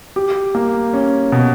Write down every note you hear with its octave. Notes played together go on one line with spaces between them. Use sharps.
G4
A#3
C#4
B2